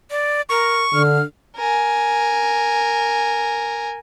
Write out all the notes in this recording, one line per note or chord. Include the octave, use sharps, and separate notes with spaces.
D5
A#4 C#6
D3 F6
A#4 G#5